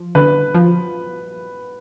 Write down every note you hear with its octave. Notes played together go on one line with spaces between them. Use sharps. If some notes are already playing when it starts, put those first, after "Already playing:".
Already playing: F3
D3 B4
F3